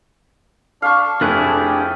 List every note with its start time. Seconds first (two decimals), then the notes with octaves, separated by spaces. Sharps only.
0.82 D4 F5 C#6
1.21 F1 A3 D4 E4 G4 G#4 F#6